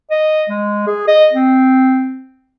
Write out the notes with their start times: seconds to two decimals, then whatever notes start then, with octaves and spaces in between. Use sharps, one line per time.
0.11 D#5
0.49 G#3
0.87 G#4
1.08 D#5
1.33 C4